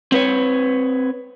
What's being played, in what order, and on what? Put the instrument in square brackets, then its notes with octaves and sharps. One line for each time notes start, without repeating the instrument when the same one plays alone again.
[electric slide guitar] C4 B4 C#5